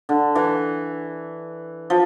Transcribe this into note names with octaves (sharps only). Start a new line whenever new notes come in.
D3
E3
F3